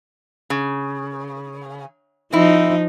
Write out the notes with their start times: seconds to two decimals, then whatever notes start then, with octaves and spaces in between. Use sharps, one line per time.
0.50 C#3
2.33 F3 C4 D#4 E4